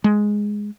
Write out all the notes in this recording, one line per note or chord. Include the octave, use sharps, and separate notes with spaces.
G#3